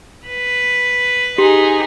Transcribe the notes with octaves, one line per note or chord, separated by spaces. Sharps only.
B4
D#4 G4 G#4